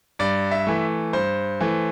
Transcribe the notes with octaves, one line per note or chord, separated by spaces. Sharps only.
G2 D5
E5
E3 A3
G2 C5
E3 A3